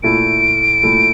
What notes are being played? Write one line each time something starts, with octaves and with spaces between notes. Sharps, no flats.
A#2 A3 E4 D7
A#2 A3 E4